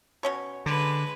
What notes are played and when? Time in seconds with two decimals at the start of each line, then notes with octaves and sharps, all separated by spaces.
0.23 B2 C#4 C#5
0.66 D3 G#3 B4